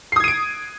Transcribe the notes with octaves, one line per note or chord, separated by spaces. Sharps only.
D#6 G#6 C7 D7 D#7